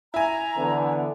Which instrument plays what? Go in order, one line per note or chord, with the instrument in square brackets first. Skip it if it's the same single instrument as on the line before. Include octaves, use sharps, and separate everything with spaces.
[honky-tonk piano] E4 G#5 [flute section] A#5
[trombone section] D3 E3 B3